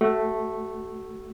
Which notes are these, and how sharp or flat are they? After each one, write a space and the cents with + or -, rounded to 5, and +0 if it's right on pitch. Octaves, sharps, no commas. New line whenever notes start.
A3 +0 F#4 +30